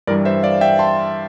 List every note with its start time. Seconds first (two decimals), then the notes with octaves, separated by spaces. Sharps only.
0.07 G2 E3 G3 A#4 D5
0.25 C5 E5
0.43 D5 F5
0.61 E5 G5
0.79 A5 C6